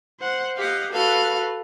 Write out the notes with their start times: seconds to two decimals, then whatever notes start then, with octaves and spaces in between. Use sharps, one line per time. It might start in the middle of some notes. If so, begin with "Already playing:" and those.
0.20 C5 F#5
0.57 G4 D#5 F5 F#5
0.91 F#4 A4 B4 F5